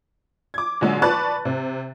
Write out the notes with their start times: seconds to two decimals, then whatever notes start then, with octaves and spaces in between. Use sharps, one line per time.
0.54 D6 G#6
0.81 A#1 A#2 D3 F#3 G#3
1.02 B4 D5 A5 C#6 F#6 A6
1.45 C3